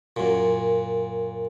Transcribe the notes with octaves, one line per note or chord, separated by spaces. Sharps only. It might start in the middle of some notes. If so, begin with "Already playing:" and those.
F#2 A#2